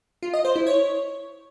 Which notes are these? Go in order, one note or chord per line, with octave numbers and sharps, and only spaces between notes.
F4
D#5
C5
E4
C#5